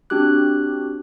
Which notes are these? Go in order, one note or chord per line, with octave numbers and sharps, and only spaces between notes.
C4 D4 F#4 G4 D6 F#6